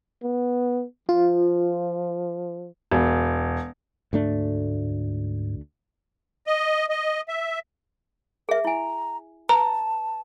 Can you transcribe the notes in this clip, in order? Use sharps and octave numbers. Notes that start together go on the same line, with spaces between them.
B3
F3 F4
E1
D2 G#2 A3 D4
D#5
D#5
E5
G#4 A#4 E5
E4 G#5 A#5
B4 A5 A#5